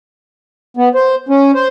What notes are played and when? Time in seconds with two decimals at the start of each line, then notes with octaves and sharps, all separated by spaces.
0.77 B3
0.95 C5
1.29 C#4
1.55 C5